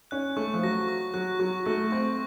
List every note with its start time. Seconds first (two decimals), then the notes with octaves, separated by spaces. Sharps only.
0.11 C#4 F#6
0.37 A3 C#6
0.54 F3
0.63 F#3 A#6
0.89 C#6
1.14 F#3 F#6
1.40 F#3 C#6
1.66 A3 A#6
1.91 C4 C#6